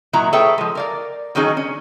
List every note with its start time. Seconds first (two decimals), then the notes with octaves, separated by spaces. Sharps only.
0.13 A#2 D#3 F#3 E4 A#5
0.33 G#4 A4 B4 C#5 E5 G5
0.58 F3 G#3
0.75 A#4 D5 F5
1.35 D3 D#3 F#3 C#4 D#4 G#4
1.57 C#4